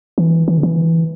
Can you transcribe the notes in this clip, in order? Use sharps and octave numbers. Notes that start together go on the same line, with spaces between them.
E3
E3
D3
E3